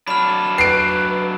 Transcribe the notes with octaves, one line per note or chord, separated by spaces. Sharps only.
F#3 D4 B5 F6
B4 C7 D7